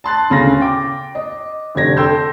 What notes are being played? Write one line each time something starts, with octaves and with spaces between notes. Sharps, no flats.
A5 C6 F#6 A6
D2 C#3 C6 A#6
G5 D6
D#5
F1 D3 G4 G#6 A#6
A4 G5 C6 E6 G6